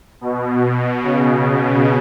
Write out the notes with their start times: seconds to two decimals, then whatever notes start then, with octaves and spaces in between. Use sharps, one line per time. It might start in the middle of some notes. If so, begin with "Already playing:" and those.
0.21 B2
1.03 C#3